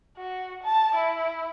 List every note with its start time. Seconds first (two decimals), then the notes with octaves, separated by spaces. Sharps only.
0.17 F#4
0.63 A5
0.95 E4